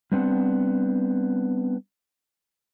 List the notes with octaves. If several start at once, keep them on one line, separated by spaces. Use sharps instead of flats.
G3 B3 C4 D4 F#5